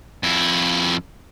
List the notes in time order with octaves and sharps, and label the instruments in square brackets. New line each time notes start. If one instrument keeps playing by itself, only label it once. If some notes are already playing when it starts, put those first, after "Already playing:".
[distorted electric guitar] F2 E4